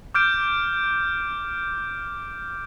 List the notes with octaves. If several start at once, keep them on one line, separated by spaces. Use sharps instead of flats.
D6 F6 G6 D7